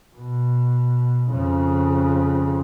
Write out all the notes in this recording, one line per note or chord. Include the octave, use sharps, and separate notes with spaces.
B2
F2 C#3